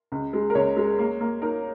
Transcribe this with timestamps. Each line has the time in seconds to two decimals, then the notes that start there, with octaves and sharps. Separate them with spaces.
0.12 C#2
0.33 G#3
0.50 A#4
0.55 C#2 C#5
0.77 G#3
0.99 A#3
1.21 A#3
1.42 D#4 A#4